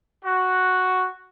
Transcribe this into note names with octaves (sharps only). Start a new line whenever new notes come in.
F#4